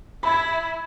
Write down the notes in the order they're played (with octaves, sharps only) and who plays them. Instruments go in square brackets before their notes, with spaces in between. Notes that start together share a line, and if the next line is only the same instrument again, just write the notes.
[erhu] E4 [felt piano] B5 G#6